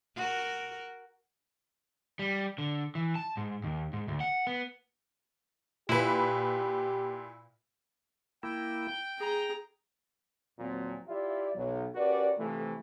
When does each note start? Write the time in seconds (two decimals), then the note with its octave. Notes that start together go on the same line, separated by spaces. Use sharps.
0.17 F#4 A#4
2.19 G3
2.58 D3
2.95 E3
3.15 A5
3.37 G#2
3.64 D#2
3.93 G#2
4.08 D2
4.20 F#5
4.47 B3
5.89 A#2 E4 G4 B4
8.43 A#3 E4 G5
8.89 G6
9.18 G#4 A#5
10.59 D#2 A#2 F3 F#3 A#3 C4
11.08 E4 F4 G4 D5 E5
11.55 B1 F#3
11.95 C#4 F#4 G4 A#4 B4 D5
12.39 C3 E3 F3 A3